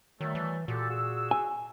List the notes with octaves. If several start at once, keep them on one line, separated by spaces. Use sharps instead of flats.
D#3 F#3 G3 A3
E3
A#2 F#4 G4 A4
F#4 G#4 E6
G#5